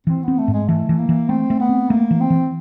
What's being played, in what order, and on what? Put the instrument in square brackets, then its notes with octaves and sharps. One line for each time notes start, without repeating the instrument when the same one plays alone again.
[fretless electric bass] E3 [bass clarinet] C4
[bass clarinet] B3 [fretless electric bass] C4
[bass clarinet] A3
[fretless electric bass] G#2
[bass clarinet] G#3
[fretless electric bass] E3 [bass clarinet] A3
[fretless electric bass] E3
[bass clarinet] A#3
[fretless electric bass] E3
[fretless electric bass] A3 [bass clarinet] C4
[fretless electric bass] A3
[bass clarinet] B3
[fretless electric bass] C4
[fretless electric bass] A3 [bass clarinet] A#3
[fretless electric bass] E3
[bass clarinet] C4
[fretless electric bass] E3